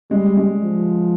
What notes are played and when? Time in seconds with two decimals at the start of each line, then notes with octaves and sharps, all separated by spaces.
0.11 G3 G#3
0.37 G#3
0.64 F3